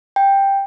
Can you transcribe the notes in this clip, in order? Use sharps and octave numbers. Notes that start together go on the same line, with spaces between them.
G5